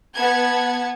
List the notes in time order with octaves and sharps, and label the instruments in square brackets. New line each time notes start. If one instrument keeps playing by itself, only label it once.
[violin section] B3 A5 G#6